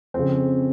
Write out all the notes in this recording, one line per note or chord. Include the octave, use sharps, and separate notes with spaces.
F2 C#3 C4